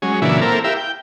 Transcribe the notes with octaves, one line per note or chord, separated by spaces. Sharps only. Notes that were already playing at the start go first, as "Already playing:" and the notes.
F#3 G#3 C#4
A#2 C#3 E3 F#3 D4 E4
A#3 C4 E4 A4 A#4
E4 G4 A#4 E5 F5
G5